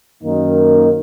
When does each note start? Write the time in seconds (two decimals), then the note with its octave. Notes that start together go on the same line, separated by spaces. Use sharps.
0.21 F#2 D#3 A#3 D#4